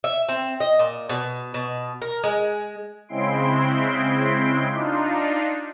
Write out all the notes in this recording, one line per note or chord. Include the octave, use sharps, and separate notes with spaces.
E5
C4
D#5
A#2
B2
B2
A#4
G#3
C#3 G#3 C4 E4 C6 D7
D4 D#4 F4